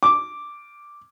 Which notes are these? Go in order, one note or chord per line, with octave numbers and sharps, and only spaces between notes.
D6